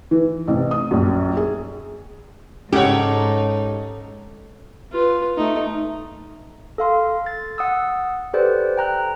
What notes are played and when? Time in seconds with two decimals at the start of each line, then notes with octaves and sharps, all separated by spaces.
0.11 E3
0.48 A1 C3
0.71 D#6
0.91 A#1 F#2
1.37 G#4
2.73 G#2 C#3 D#4 G4 A4 C#5 F#5
4.92 F4 B4
5.37 A3 D#4
6.78 A4 F5 C6
7.26 A6
7.58 F#5 D#6 E6
8.33 G4 A4 B4 C5 D5
8.77 G5 A#5 F#6